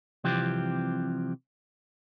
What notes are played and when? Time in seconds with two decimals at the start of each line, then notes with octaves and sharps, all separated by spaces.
0.24 C2 C3 E3 F3 C4 G4